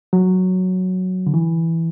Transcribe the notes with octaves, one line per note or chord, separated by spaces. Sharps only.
F#3
D3
E3